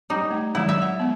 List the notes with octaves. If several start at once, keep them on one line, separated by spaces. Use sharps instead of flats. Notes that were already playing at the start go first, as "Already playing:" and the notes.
G3 D#4
A3
D#3 F#3 G#3 E4
E5
F#5
G#3 B3